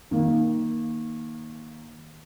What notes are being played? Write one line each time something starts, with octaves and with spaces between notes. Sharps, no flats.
D#3 A#3